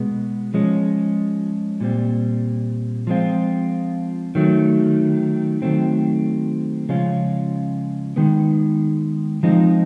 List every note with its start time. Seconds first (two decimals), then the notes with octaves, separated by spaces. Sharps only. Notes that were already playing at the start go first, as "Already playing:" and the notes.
Already playing: B2 G#3 B3
0.54 F3 G#3 C#4
1.81 A#2 G3 C4
3.07 F3 G#3 C4 F4
4.35 D#3 F#3 A3
5.62 D#3 F#3 A3 C4
6.89 C#3 F3 G#3 C#4 F4
8.16 D#3 G#3 B3
9.43 F3 G#3 C4 D#4